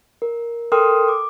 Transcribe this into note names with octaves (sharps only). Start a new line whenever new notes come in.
A#4
A4 A#4 G5 C6 D#6 F6
D6